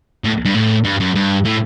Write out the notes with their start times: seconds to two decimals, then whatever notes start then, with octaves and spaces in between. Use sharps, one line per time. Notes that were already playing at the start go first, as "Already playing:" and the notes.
0.24 A2
0.45 G2
0.55 A2
0.85 G2
1.00 F#2
1.15 G2
1.45 A2